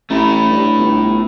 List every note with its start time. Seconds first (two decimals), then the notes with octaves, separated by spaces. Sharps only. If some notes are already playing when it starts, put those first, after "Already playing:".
0.10 A1 A3 E4
0.51 G2
0.78 G1